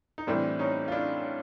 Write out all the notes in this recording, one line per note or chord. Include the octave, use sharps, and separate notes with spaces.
D#4
A2 E3 G3 C4 D4
C#4 D#4
F4
D4 E4